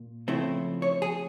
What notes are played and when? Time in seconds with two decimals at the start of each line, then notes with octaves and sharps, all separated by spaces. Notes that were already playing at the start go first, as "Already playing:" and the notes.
Already playing: A#2
0.28 C#3 F3 A3 C4 E4
0.82 C#5
1.02 G#4